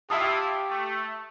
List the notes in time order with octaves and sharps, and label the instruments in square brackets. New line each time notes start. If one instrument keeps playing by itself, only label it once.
[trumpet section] E4 F4 [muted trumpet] G4 [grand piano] E5 A5 D#6
[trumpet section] A3